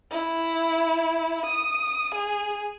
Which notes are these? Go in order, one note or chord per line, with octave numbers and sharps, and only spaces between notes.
E4
D#6
G#4